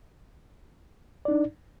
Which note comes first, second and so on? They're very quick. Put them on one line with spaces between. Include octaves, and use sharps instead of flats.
D5 D#4 D4